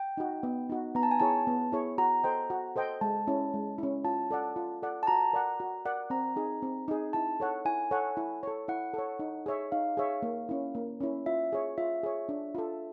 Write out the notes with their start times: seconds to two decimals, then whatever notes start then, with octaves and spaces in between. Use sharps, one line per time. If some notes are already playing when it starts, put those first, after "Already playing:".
Already playing: G5
0.17 D#4 F#4
0.43 B3
0.70 D#4 F#4
0.95 B3 A#5
1.03 A5
1.11 G#5
1.20 E4 G#4 C#5 A5
1.47 B3
1.73 E4 G#4 C#5
1.98 F#4 A#5
2.24 A4 C5 D#5 G5
2.50 F#4
2.76 A4 C5 D#5 G5
3.01 G#3 A5
3.27 C#4 E4
3.54 G#3
3.78 C#4 E4
4.04 F4 A5
4.31 A4 D5 F#5
4.56 F4
4.82 A4 D5 F#5
5.03 A5
5.07 F#4 A#5
5.33 A#4 D5 F#5
5.60 F#4
5.86 A#4 D5 F#5
6.10 C4 A#5
6.36 D#4 G#4
6.62 C4
6.88 D#4 G#4
7.13 E4 A5
7.40 A4 C#5 F#5
7.65 E4 G#5
7.91 A4 C#5 F#5
8.17 E4
8.43 A4 C#5
8.68 E4 F#5
8.94 A4 C#5
9.19 D#4
9.46 G#4 C#5 E5
9.72 D#4 F5
9.97 G#4 C#5 E5
10.23 A#3
10.49 C#4 E4
10.75 A#3
11.00 C#4 E4
11.26 F4 E5
11.53 G#4 C#5
11.78 F4 E5
12.03 G#4 C#5
12.29 D4
12.55 F4 A4